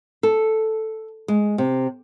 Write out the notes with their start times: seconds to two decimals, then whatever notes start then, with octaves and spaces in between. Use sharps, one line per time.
0.23 A4
1.28 G#3
1.58 C3